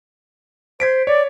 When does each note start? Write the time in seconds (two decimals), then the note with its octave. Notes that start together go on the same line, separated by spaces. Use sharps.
0.80 C5 G#6 B6 D7
1.07 C#5 D5